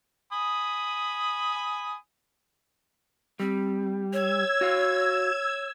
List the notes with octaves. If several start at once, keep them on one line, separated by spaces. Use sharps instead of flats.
G#5 B5 D#6
G3 C4
C#5 E6 G#6
F#4 F5